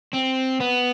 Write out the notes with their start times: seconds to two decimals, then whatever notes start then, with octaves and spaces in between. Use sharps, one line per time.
0.14 C4
0.60 B3